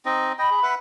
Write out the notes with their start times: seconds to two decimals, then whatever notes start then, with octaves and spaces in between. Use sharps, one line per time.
0.05 C4 D#4 D#5
0.39 D#5 G5 B5
0.51 G#4
0.63 B4 E5 F#5